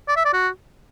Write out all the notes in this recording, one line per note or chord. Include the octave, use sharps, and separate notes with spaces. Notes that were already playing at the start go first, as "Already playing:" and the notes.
D5
E5
D5
F#4